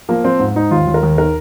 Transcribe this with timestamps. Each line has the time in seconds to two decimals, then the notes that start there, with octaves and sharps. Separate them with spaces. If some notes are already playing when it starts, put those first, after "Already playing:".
0.09 F3 A#3
0.24 F3 C4
0.40 G#2
0.55 G#2 D#4
0.71 D#2 F4
0.87 D#2
0.94 A#4
1.03 D#2
1.18 D#3 A#4